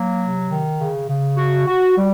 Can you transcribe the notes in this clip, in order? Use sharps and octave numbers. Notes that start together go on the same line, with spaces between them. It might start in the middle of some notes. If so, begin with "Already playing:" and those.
Already playing: F#3 A#3
C3
D#3
C#3
C#3
F#4
F#4
G3